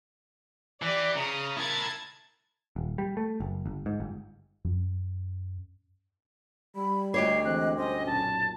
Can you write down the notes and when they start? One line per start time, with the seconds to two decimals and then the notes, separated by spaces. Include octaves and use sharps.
0.82 E3 G4 D5
1.16 C#3 A#5 D#6
1.57 E4 A#4 A5 G#6 A6
2.76 D#1
2.98 G3
3.17 A3
3.40 F#1
3.66 G1
3.86 G#2
4.00 G1
4.65 F#2
6.76 G3 B5
7.14 D2 G4 C#5 D#5 C7
7.45 E3 G#3 C4 F#6
7.77 G2 C#4 C5 D#5
8.06 B1 F#2 A#2 A5